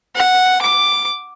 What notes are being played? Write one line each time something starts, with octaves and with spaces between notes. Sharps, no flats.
F#5
D6